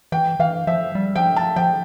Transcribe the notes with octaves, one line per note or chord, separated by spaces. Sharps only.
E3 G5
E3 F5
F3 E5
G3
F3 G5
A5
F3 G5